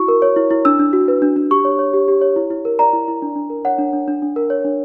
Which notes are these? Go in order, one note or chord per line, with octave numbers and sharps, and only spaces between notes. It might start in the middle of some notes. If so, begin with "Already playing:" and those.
Already playing: E4 F#4 C#6
A#4
C#5
E4
E4
D4 E6
D4
F#4
B4
D4
D4
G4 C#6
C#5
C#5
G4
G4
C#5
E4
E4
A#4
D5 A#5
E4
E4
D4
D4
A#4
C#5 F#5
D4
D4
D4
D4
A#4
C#5
D4